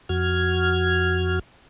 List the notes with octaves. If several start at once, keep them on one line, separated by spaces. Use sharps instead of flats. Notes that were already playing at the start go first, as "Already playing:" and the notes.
F2 F#4 F6 G#6